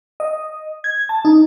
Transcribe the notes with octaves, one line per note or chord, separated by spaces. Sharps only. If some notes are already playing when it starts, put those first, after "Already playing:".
D#5
G#6
A5
D#4